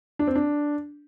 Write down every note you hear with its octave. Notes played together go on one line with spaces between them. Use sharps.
D4
C4
D4